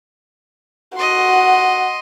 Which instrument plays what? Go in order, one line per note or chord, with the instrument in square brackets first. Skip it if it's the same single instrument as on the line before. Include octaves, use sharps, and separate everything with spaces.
[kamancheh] F#4 F#5 [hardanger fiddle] D#5 C6